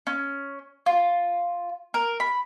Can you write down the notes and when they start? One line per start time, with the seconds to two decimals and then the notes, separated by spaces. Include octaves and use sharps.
0.07 C#4
0.86 F4
1.94 A#4
2.20 B5